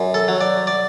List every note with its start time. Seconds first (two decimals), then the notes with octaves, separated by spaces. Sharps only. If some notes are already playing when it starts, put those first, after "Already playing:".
Already playing: F#2
0.14 A4
0.28 F#3
0.41 D5
0.67 D5